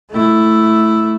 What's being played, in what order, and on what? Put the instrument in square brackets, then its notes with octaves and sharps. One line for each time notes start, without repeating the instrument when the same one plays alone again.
[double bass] A3 E4